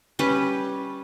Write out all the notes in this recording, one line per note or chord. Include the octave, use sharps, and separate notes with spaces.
G3 C#4 B4